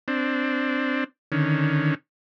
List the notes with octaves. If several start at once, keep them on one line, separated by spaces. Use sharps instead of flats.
C4 D4
D3 D#3 C#4